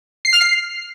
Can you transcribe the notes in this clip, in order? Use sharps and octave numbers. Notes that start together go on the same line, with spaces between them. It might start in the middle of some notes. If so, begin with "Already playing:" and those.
C7
F6
C7